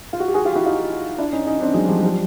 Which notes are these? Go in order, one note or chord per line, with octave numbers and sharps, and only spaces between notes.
F4
F#4
G4
F#4 G#4
F4 G4
E4 F#4
D#4 F4
D4 E4
C#4 D#4
C#4 D#4
C4 D4
F#3 G#3
F3 G3
F3 G3